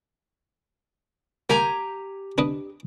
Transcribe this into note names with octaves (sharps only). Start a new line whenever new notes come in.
A#3 G4 G#5 A#5
D4 B4 D#5